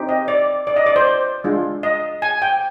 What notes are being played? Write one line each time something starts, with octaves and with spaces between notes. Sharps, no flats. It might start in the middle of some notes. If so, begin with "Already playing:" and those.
Already playing: C4 D#4 G4
D#5
D5
D5
D#5
D5
C5
G#3 D4 F4
D#5
G#5
G5